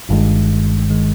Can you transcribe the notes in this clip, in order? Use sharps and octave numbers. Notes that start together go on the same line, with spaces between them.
G1 G2 D#3 G#3
D#3 G#3